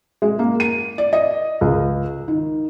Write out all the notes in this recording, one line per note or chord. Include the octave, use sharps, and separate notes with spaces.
G#3
A#3
D#7
D5
D#5
C#2
D#3